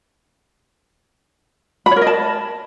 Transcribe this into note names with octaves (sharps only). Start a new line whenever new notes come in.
B5
C#5
A#4
D#5
A5